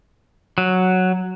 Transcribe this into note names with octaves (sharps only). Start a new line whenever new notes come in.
F#3